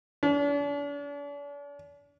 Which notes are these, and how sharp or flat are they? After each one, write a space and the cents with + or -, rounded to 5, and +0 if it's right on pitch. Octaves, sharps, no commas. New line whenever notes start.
D4 -45